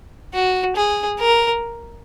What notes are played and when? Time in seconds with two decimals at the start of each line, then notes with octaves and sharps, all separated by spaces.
0.34 F#4
0.76 G#4
1.19 A#4